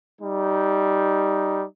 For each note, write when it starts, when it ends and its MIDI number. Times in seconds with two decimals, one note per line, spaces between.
0.20 1.65 55
0.20 1.65 63